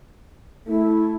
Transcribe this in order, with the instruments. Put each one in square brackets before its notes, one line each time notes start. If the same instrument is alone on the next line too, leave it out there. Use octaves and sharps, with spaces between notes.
[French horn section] A3 [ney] E4